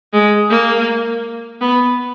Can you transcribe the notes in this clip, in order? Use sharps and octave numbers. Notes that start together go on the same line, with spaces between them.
G#3
A#3
B3